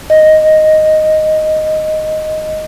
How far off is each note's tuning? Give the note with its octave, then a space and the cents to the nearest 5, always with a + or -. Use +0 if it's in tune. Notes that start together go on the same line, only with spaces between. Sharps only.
D#5 +0